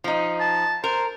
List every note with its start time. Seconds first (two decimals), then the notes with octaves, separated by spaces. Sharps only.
0.04 F3 D#4
0.40 A5
0.84 A#4 C5